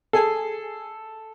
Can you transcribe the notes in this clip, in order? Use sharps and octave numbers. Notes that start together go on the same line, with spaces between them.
G#4 A4 G#5 C7